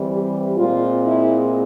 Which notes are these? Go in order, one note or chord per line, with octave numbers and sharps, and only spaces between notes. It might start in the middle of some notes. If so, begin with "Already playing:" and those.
Already playing: E3 G3 C4
G4
A#2 G#3 C4 F4
E4